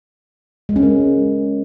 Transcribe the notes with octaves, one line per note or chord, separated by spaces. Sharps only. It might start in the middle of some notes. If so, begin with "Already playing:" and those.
G#3
C#4
A#4